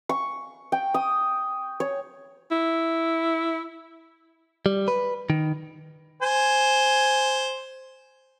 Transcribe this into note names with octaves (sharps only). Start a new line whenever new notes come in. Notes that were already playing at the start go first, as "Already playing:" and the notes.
C#6
G5
D#6
C#5
E4
G3
B4
D#3
C5 G#5